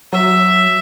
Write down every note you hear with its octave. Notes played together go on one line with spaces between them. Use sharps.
F#3 E5